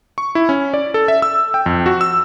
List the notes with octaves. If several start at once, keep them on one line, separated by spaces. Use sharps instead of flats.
C#6
E4
C#4
D5
A4
E5
E6
G5
F2
F#4
E6